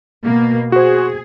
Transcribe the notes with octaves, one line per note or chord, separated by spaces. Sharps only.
B2 A#3
F#4 G#4 C5